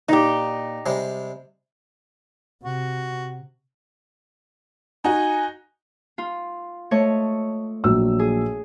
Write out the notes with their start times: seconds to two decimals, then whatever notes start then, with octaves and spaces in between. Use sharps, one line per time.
0.09 A#2 D#4 G4
0.86 C3 G3 G#3
2.64 C3 F#4
5.04 D#4 F#4 G#5
6.18 F4
6.91 A3 C#5 D#5
7.84 A#1 F#3 E6
8.19 G#4